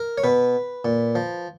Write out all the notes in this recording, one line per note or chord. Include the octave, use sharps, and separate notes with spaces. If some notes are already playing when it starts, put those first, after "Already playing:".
Already playing: A#4
C#5
B2 B4
A#2
F3